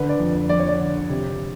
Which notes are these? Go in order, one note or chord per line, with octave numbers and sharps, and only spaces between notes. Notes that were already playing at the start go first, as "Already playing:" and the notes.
Already playing: D3 B4
D5
F2
F2 D5
C#5
D5
D3
C3